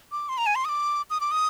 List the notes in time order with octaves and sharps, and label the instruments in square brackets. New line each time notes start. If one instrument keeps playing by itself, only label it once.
[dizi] D6
C6
A#5
G#5
C6
D#6
D6
D#6
D6
D#6